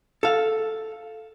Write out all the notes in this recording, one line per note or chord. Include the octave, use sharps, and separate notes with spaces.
A4 F5